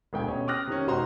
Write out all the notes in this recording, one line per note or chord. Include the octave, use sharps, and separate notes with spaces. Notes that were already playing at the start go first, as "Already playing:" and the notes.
E1 D2 G5 G#5
B2 C#4 G4
D6 D#6 F6 F#6 A#6
C3 D#3 C#4
E1 C4 D#4 F#4 A#5 C6